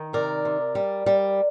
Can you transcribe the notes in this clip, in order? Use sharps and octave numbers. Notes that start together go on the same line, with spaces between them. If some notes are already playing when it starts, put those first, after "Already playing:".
Already playing: D#3
C3 A#4 D5
C3
G3
G3